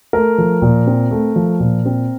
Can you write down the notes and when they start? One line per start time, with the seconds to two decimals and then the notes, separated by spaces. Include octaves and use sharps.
0.13 A3 A#4
0.38 F3
0.62 A#2
0.87 C4
1.11 A3
1.36 F3
1.60 A#2
1.86 C4